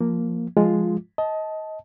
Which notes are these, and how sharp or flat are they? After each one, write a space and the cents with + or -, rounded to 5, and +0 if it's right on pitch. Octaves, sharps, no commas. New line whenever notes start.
F3 +0 A#3 +0
F3 +0 G#3 +0 F4 +0
D#5 +20 A5 -10